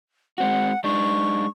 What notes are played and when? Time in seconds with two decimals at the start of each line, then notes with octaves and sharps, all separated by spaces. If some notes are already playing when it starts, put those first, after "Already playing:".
0.38 G#3 C4 F#4 F#5
0.84 G#3 D4 D#4 C#6